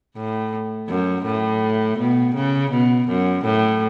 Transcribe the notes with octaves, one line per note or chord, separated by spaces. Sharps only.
A2
F#2
A2
B2
C#3
B2
F#2
A2